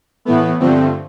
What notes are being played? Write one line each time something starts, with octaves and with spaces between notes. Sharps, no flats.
A2 E3 A3 B3
G2 D3 F3 A3 C4